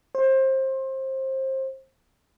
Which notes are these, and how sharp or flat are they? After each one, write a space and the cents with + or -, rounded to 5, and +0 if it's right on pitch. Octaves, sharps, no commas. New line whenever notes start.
C5 +25